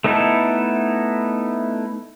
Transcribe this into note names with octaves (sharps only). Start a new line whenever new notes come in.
A3 B3 D#4 E4 A4